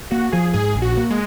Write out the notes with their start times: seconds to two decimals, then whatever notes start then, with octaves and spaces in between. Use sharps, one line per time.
0.11 A#3 F#4
0.32 F3 G#4
0.53 G#2 G#4
0.76 A#1
0.82 F#4
0.97 A#3
1.10 G#3